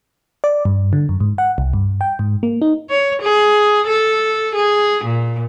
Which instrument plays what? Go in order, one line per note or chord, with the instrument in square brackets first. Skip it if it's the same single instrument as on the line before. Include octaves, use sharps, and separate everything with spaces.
[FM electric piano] D5
G2
D3
F#2
G#2
F#5
C2
G2
G5
G#2
A#3
D#4
[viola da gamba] C#5
G#4
A4
G#4
A#2